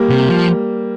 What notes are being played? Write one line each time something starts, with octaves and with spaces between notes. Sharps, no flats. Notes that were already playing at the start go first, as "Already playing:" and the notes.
Already playing: G3 A#3
C3
F3